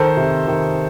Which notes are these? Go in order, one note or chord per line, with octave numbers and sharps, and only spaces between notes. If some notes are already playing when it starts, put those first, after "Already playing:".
Already playing: D#3 A4 C5
C3
D#3